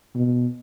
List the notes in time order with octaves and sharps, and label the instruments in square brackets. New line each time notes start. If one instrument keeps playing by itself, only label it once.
[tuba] B2